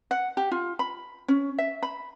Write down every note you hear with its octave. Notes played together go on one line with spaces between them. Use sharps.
F#5
G4
F4
B5
C#4
E5
B5